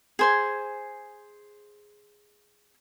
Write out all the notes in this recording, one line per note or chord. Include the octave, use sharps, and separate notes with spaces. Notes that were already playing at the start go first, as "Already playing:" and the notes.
G#4 C5 G#5